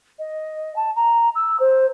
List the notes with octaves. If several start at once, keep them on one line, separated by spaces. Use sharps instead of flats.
D#5
A5
A#5
E6
C5